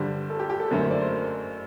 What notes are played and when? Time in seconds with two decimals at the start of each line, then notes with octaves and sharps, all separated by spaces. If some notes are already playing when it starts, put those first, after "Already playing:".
Already playing: G2 D3 G3 C5
0.30 A4
0.40 G4
0.50 G4
0.60 A4
0.70 F#1 F#2 D3 A3 A#4
0.80 C5
0.91 D5
1.01 C5
1.11 A#4